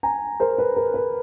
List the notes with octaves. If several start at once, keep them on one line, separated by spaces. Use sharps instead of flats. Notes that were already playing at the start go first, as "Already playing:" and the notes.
G#5 A#5
A#4 C5
B4
A#4
B4